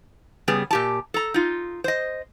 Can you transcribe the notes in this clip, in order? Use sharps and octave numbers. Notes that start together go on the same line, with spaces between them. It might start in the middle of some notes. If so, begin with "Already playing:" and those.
C#3 G3 B3 G#4
A#2 G4 A5
A4 A#5
D#4 F4
C5 D#5